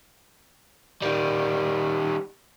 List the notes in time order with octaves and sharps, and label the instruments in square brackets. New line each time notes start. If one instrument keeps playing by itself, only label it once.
[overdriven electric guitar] D#3 G3